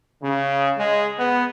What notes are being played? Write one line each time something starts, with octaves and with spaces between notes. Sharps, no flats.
C#3
G#3
B3